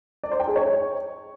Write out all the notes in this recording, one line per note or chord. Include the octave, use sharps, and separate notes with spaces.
D5
C5
G5
G#4
C#5